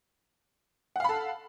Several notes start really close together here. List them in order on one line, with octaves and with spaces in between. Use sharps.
F#5 F5 B5 A4